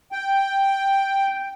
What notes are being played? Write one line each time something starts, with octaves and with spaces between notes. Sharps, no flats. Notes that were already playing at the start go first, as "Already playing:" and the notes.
G5